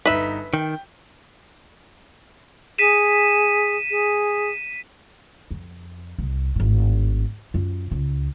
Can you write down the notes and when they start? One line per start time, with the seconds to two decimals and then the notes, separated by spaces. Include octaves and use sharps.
0.06 G1 D#4 B4 E5 B6
0.54 D#3 G5
2.78 G#4 B6 D#7 E7
3.90 G#4
5.51 F2
6.18 C2
6.56 G#1 A2
7.54 F#2 F4
7.91 C#2